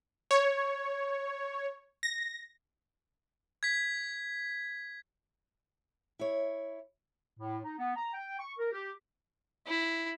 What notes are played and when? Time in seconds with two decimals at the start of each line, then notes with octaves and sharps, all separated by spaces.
0.31 C#5
2.03 A#6
3.63 G#6 B6
6.19 E4 C#5
7.40 A2
7.64 D#4
7.79 B3
7.96 A#5
8.14 G5
8.39 C#6
8.59 A#4
8.72 G4
9.67 E4